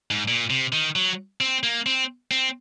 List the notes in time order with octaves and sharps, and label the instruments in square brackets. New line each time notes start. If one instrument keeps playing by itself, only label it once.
[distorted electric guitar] G#2
A#2
C3
D#3
F#3
C4
A#3
C4
C4